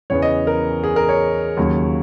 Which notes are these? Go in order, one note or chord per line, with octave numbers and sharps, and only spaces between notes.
E2 C#3 E3 B3 C#5
D#5
A#4
G#4
A#4
C#5
D#2 C#3 F#3